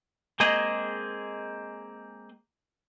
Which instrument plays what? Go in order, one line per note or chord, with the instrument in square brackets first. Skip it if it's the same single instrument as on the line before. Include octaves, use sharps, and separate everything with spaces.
[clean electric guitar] G#3 A#3 C4 G#4 D#5